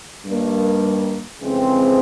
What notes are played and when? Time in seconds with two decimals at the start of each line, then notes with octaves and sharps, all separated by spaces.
0.25 G2 D#3 G3 A#3
1.40 F2 C#3 E3 G#3 C4